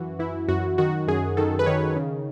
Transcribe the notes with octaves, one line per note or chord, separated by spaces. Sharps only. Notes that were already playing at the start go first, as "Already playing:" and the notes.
Already playing: F#2 E3 F#4
E3 E4
F#2 F#4
D#3 F#4
F#2 G#4
D#3 A4
B4
D#3 C#5
C#3